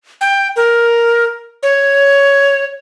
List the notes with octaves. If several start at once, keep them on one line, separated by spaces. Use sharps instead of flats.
G5
A#4
C#5